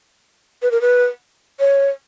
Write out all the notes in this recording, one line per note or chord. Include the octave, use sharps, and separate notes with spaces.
B4
A#4
B4
C#5